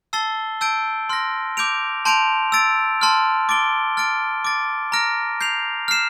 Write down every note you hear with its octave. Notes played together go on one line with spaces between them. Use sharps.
A5 E6 A6 C7 G7
A5 E6 G6 D7
C6 F6 A#6
D6 G6 D7 F7
A5 C6 G6 D7 F7
E6 A6 D7
A5 C6 F6
D6 A6 D7 G7
F6 A6 D7
D6 A6 D7
A#5 F6 A#6 D7
G6 C7 F7
F6 C7 E7